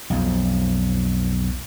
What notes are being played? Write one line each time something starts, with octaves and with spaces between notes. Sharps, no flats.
B1 F2